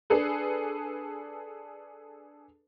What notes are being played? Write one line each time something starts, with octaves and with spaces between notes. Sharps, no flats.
D4 G#4 A4 B4